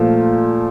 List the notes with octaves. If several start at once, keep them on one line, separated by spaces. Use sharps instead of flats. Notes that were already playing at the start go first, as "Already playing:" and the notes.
Already playing: A#2 F3 A3